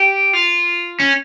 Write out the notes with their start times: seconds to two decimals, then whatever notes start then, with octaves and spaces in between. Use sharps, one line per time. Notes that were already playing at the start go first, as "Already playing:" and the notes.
Already playing: G4
0.33 F4
1.00 C#4